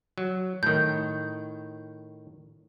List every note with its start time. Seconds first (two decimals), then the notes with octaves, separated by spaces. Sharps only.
0.18 F#3
0.63 A2 D#3 G6